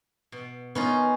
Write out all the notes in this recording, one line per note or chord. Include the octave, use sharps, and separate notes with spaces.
B2
B3 C#4 D#4 F4